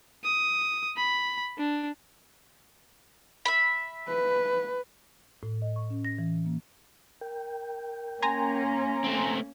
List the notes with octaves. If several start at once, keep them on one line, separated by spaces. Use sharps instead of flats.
D#6
B5
D4
E5 B5
B4
A2
D#5
C#6
C#4
A#6
E3
A#3
A#4 G5
A#3 C#4 G#5 A#5 C6
A3 C4